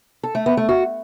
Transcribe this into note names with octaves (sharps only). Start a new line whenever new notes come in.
A4
A3
B3
A3
F#4